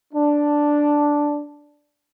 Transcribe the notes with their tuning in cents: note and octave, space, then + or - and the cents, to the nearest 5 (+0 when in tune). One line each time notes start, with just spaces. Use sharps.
D4 +0